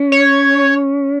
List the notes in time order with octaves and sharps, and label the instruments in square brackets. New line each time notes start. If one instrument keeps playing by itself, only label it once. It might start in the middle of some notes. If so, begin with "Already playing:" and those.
Already playing: [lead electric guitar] C#4
[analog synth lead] C#5